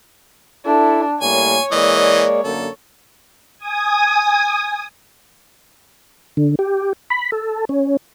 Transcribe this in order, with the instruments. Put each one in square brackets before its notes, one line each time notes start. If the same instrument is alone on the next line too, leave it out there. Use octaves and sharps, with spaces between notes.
[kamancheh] D4 [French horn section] E4 A4
[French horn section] A2 G3 A#3 [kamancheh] C#5 [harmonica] G#5
[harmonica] E3 D#5 [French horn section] G#3 A#3 D5
[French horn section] F#2 D3 A#3 [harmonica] A4
[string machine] G#5 D#6
[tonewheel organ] D3
G4
B5
A4
C#4